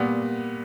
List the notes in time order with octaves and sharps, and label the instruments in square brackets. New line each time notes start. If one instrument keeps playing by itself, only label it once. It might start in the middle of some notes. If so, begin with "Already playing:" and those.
Already playing: [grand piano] A#2 G3 B3